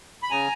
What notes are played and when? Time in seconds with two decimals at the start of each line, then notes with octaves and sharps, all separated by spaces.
0.23 B5
0.30 C#3 G#5 A#5